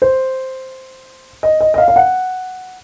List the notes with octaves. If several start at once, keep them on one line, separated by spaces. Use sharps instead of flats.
C5
D#5
D#5
D#5
F5
F5
F#5